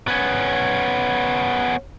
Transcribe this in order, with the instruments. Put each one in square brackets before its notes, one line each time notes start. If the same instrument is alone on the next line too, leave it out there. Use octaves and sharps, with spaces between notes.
[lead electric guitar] B3 C#4